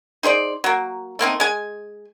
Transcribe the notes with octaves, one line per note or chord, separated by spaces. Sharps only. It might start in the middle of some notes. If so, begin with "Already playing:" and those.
D#4 G#4 C5 D5
F#3 A#3
A3 A#3 C4 D#4
G#3 G#5